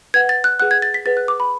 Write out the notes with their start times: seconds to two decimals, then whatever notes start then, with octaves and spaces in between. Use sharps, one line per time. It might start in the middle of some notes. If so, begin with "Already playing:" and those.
0.14 B4 F#5 G#6
0.29 A6
0.44 F#6
0.60 G#4 B4 F#5 F#6
0.71 G#6
0.82 A6
0.94 B6
1.06 G#4 B4 F#5 A6
1.17 F#6
1.28 D6
1.40 B5